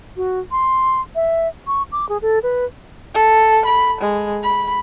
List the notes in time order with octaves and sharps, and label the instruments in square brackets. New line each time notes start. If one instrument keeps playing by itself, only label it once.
[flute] F#4
C6
E5
C#6
D6
G#4
A4
B4
[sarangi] A4
B5
G#3
B5